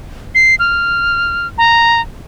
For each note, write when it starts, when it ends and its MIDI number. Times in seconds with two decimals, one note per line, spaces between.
0.35 0.55 96
0.59 1.47 89
1.58 2.01 82